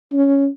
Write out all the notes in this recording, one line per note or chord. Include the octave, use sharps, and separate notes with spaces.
C#4